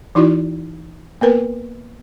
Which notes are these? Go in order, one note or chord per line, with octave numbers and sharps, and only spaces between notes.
E3 D#4 E4 F#4 D5
A#3 B3 A#4 B4